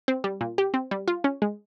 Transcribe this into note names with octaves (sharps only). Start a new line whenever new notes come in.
C4
G3
A#2
G4
C4
G3
F4
C#4
G#3